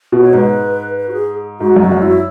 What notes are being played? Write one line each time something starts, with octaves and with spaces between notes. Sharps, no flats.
B2
C#5
G#2 B4
B4
F#4
G#4
G#2 F#4
F#2 F#4
F#2
E4